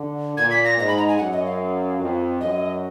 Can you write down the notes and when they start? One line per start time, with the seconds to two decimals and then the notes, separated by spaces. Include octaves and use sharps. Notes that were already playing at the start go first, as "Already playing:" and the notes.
Already playing: D3
0.37 A#2 G#6
0.51 B6
0.65 A#6
0.77 G#2 A#6
0.88 B5
0.98 A#5
1.08 G#5
1.18 F#2 F#5
1.32 D#5
1.46 F5
2.00 F2
2.41 F#2 D#5